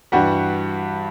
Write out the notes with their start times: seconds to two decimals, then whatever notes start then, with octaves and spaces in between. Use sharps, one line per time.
0.12 G2 E3 G3 F#4 F#5